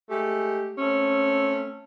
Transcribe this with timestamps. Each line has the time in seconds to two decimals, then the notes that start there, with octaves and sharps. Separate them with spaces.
0.10 G#3 A3 G4
0.77 A3 C4 C#4